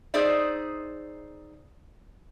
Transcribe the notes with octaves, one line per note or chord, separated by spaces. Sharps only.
D#4 G#4 C5 D5 E5